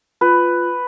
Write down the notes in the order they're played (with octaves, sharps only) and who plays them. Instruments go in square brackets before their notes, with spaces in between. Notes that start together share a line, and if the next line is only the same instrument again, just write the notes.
[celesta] F4 [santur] B4